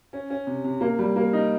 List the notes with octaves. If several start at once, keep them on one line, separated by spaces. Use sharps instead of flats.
C#4
C#4
C3
C3
A#3
G3
A#3
D#4